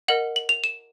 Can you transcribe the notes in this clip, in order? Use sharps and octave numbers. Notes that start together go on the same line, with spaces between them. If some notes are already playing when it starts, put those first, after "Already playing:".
A#4 D#5 F#5 F#7
F#7
F7
E7